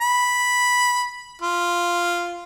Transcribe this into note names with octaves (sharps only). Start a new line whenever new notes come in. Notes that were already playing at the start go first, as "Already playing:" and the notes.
B5
F4